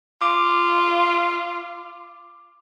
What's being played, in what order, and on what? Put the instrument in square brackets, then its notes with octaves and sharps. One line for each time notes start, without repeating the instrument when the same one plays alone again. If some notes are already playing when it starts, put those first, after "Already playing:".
[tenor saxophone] F4 [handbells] D6